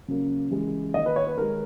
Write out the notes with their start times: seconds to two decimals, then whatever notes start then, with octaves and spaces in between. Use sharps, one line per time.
0.08 C#3 F#3 A#3
0.51 C#3 E3 G#3
0.94 D#3 A#3 D#5
1.06 B4
1.16 C#5
1.27 B4
1.37 D#3 G#3 A#4